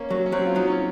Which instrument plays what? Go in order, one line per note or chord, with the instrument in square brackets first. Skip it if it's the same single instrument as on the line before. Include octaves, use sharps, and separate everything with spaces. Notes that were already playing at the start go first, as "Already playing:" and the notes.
Already playing: [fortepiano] A#3 C#4
[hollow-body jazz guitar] F#3
[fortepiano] C#4
[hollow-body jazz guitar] F#3 [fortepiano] C4
[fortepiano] F4
[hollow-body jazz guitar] F#3 [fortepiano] D#4
[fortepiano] C#4